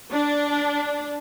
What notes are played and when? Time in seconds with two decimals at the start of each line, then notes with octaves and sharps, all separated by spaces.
0.12 D4